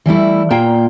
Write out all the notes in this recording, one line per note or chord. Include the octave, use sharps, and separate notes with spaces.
E3 G3 A3 E4
A#2 A#3 F4 G5